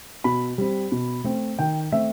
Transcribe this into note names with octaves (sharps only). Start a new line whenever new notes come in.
B2 B5
G3 C4
B2
A3 C4
D#3 G5
A3 C4 E5